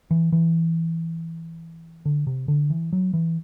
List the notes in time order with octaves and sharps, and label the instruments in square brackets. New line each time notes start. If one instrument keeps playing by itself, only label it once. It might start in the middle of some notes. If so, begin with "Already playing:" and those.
[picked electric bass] E3
E3
D3
C3
D3
E3
F#3
E3